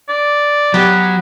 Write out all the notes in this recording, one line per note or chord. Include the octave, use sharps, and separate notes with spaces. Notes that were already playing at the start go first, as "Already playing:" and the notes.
D5
F#3 B3 G4